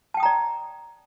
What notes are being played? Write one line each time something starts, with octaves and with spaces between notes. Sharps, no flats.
D5 G5 A5 A#5 D#6